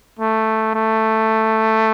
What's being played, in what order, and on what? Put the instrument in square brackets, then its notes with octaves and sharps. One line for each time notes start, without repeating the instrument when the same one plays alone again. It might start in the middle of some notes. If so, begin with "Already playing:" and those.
[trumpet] A3
A3